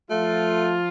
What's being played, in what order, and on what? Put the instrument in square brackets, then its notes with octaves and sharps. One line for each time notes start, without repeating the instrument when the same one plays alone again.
[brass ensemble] F3 F4 [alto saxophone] A3